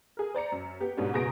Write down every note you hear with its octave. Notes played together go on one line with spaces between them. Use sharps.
G#4 A#4
C5 D5 A#5 C#7
F#2
B3 G4
G#2 B2 G3 C#4 D4
F#1 B2 G#4 A#5 A#6 D7